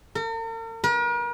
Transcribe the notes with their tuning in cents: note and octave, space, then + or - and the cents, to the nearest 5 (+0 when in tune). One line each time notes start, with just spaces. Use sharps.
A#4 -45
A#4 +45